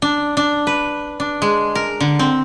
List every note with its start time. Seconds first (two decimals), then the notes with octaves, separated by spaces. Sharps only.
0.02 D4
0.37 D4
0.67 B4
1.20 D4
1.42 G#3
1.75 A#4
2.01 D3
2.19 C4